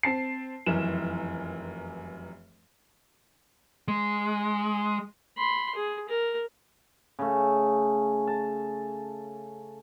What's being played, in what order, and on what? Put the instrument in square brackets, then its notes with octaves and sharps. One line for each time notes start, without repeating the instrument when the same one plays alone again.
[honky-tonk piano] C4 A5 C7
F1 F#2 E3 E7
[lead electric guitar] G#3
[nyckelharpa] B5 C6
G#4
A#4
[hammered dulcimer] C#3 A3
A5